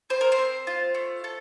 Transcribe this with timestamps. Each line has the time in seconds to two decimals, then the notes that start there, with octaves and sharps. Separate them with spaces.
0.10 C4 C5
0.21 A#4
0.32 C5
0.38 C4
0.67 F4
0.95 A3
1.24 A4